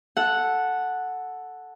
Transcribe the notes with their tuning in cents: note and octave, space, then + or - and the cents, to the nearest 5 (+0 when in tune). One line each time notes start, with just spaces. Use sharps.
A4 +0 F#5 -5